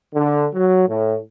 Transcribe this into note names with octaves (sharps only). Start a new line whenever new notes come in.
D3
F#3
A2